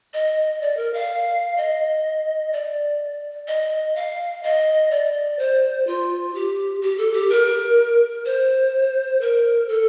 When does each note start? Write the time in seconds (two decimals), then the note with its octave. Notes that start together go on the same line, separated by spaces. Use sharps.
0.14 D#5
0.61 D5
0.77 A#4
0.94 F5
1.57 D#5
2.53 D5
3.47 D#5
3.96 F5
4.43 D#5
4.91 D5
5.39 C5
5.87 F4
6.35 G4
6.82 G4
6.98 A4
7.13 G4
7.30 A#4
8.25 C5
9.21 A#4
9.69 A4